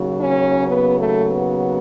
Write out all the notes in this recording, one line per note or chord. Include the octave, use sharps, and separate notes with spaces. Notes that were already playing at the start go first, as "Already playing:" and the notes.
Already playing: D#2 C#3 F#3
C#4
B3
A3
B3